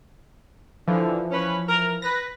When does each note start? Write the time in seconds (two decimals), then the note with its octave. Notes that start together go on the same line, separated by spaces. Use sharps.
0.88 D3 E3 F3
1.32 C#4 B4
1.67 A#4
2.02 B4 A#6